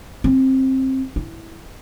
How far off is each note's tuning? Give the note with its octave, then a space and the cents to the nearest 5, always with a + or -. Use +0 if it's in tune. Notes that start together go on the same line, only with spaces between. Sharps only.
C4 +15
E4 -5